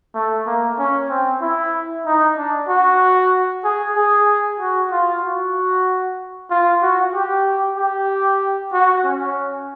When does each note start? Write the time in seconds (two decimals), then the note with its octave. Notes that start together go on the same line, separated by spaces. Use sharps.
0.15 A3
0.47 A#3
0.79 C#4
1.10 C4
1.42 E4
2.06 D#4
2.38 D4
2.69 F#4
3.65 G#4
3.96 G#4
4.60 F#4
4.91 F4
5.23 F#4
6.51 F4
6.82 F#4
7.15 G4
7.78 G4
8.73 F#4
9.05 C#4